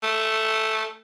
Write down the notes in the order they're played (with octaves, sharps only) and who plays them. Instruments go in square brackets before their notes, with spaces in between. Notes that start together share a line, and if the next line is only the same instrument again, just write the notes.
[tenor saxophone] A3